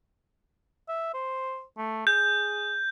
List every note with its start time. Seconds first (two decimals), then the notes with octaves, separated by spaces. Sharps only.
0.88 E5
1.14 C5
1.78 A3
2.07 G#4 G6